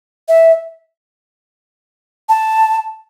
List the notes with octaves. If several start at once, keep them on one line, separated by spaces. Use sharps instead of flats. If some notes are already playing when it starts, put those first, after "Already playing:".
E5
A5